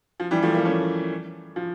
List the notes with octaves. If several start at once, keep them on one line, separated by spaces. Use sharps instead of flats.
F3
E3 G3
F3 A3
G3 A#3
A3 C#4
F3